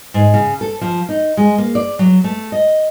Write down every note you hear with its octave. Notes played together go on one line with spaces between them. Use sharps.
G#2
C#3
A4
F3
D#4
G#3
A#3
D5
F#3
A3
D#5